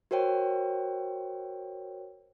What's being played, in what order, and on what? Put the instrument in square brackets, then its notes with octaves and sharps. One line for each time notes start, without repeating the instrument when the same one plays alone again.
[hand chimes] F#4 A#4 C5 C#5 G5